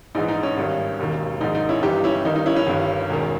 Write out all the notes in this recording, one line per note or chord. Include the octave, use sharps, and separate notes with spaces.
A#1 G#2 E3 D#4
D#4
C#4
G#1 G2 D#3
E1 D#2 D#3
A#1 G#2 D#3 D#4
D#4
C#4 E4
G1 G2 E3 D#4 G4
C#4 E4
G1 G2 D#3 D#4
D#4
C#4 E4
C#4 E4
G1 G2 D#3
E1 E2 D#3